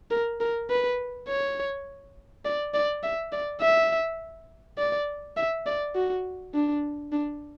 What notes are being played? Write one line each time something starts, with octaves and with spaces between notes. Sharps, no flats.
A#4
A#4
B4
C#5
D5
D5
E5
D5
E5
D5
E5
D5
F#4
D4
D4